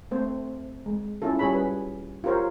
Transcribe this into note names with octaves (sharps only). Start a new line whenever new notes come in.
A3 C4 C5
G#3
C#4 E4 F4 A4
G3 C#4 G#4 C#5 B5
B4
F4 G4 A#4 C5 C#5